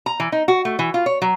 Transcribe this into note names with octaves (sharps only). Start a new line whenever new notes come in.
A#5
E3
D#4
F#4
A3
E3
F4
C#5
F#3